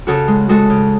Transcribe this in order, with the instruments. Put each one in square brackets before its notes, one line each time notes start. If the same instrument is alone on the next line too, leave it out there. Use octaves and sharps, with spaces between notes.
[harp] C#3 F#4 A4
G#3
G#3 F#4 A4
C#3